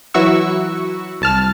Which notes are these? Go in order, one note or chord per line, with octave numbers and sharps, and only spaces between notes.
E3 F#3 E4 F#4 C#6 E6
C2 A5 F6